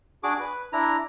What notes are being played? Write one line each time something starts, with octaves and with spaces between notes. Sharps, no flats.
D4 F#4 G#4 D6
B4
D4 E4 A#5